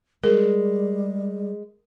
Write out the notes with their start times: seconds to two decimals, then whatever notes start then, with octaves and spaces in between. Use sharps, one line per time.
0.23 G3 G#3 G#4 A#4